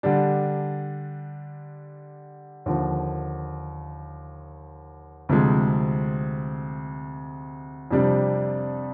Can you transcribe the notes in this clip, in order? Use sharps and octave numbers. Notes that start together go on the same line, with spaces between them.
D3 G3 D4
D#2 D3 F3
D2 C3 F3 G#3
F2 C3 G3 D4